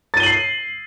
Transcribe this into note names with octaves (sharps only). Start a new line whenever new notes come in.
A6 C7 D#7 F#7 G7